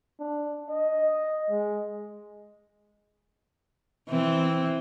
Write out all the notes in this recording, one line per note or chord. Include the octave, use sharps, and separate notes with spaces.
D4
D#5
G#3
E3 C4